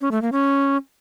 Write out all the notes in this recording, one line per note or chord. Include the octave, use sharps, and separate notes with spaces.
C#4
A3
A#3
C#4